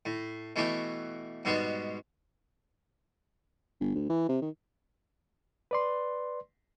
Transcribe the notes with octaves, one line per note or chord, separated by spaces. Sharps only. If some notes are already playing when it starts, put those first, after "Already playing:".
A2
B2 E3 A3 E4 F#4 G4
G#2 B2 G3 G#3 B3 F#4
G1
D2
E3
C3
D#3
B4 D5 C6